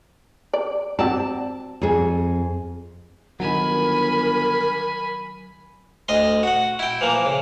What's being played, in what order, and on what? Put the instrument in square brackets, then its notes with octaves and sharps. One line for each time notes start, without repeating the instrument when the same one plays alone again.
[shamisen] D5
[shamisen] C4 F#4 D5 [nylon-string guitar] A5
[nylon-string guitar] F2 G#4
[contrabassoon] G1 [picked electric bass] D#3 F#3 [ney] A#4 [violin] G#5 B5
[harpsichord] D2 D#5 C6
F#4 F#5
E4 G5
E3 F3 A#3
C#3